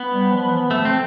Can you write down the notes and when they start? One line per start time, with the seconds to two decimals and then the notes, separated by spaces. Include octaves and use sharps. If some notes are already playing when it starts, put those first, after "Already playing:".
Already playing: B3
0.11 G3
0.31 F3
0.51 E3
0.71 F3 A3
0.85 C4